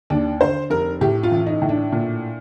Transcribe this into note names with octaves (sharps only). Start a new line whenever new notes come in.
D#2 D4
D3 C5
F1 A#4
A2 G4
F4
A1
D#4
A2
D4
A#2